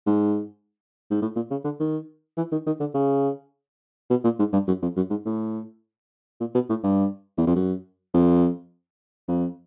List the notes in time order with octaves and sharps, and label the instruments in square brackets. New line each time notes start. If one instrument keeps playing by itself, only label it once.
[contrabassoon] G#2
G#2
A2
A#2
C#3
D3
D#3
E3
D#3
D#3
D3
C#3
B2
A#2
G#2
G2
F#2
F2
F#2
G#2
A2
A#2
B2
A2
G2
E2
F2
F#2
F2
F2